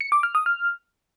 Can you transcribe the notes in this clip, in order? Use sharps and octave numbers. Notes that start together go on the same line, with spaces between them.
C#7
D6
F6
D#6
F6